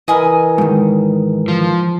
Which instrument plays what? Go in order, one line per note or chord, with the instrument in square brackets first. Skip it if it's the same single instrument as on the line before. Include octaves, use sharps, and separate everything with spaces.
[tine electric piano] E3 A#4 [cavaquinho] D#5 G#5 B5
[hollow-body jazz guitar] G#2 D#3
[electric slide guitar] F3